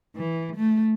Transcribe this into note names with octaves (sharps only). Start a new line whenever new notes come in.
E3
A3